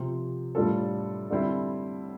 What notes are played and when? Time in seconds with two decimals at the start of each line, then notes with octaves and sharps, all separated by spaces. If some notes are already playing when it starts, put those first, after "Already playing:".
Already playing: C3 F3 C4
0.55 A2 G3 D4 F4 A4
1.30 D3 G3 C4 E4